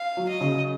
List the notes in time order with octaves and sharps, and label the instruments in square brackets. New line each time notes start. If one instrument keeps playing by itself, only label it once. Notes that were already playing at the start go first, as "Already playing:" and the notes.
Already playing: [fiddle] F5
[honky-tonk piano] F#3
[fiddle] D#5
[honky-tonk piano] C#3